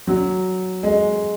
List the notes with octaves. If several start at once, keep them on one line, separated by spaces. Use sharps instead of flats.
F#3
G#3